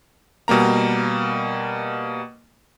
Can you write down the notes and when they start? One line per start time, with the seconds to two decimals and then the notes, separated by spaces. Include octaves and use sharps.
0.48 B2 G3 A#3 A#5